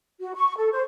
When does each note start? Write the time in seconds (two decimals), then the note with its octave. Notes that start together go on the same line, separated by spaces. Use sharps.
0.20 F#4
0.35 C#6
0.57 A4
0.72 C5